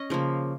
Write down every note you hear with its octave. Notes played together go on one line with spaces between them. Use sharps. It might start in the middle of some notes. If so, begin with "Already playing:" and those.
Already playing: C#4 D#5
C#3 F3 A#3